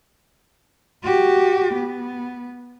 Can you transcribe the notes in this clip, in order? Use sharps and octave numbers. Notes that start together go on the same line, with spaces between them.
F#4 G4
B3